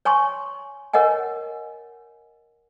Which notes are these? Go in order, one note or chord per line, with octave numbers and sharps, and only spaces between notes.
C#5 G#5 C6 C#6
A#4 C#5 D#5 F#5 G#5